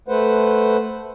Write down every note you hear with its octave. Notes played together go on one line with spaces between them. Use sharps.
A3 B4 C5 F#5